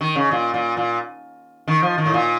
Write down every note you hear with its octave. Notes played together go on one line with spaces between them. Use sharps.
D#3
C#3
A#2
A#2
A#2
D#3
F3
D#3
A2
A#2